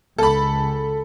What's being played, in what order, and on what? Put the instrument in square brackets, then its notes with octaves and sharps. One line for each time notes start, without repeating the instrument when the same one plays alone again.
[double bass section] C#2 [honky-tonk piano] A4 B5